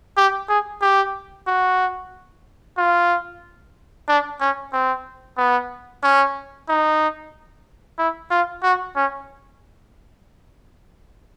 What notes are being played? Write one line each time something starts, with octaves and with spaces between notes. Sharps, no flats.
G4
G#4
G4
F#4
F4
D4
C#4
C4
B3
C#4
D#4
E4
F4
F#4
C#4